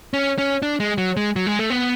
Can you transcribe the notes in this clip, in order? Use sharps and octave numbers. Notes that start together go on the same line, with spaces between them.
C#4
C#4
D4
G#3
F#3
G#3
F#3
G#3
A3
B3